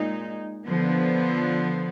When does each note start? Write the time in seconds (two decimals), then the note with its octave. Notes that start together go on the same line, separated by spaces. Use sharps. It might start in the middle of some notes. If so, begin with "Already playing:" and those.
Already playing: A#2 G#3 D#4
0.67 D3 F3 B3